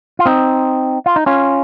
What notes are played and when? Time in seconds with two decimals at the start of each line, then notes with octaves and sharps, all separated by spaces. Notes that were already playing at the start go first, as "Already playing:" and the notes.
0.19 F4
0.26 C4 D#4
1.06 F4
1.16 D#4
1.26 C#4 F4